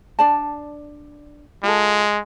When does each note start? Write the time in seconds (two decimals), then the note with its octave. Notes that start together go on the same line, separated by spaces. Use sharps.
0.19 D4 D5 A5
1.63 G#3 F4 A4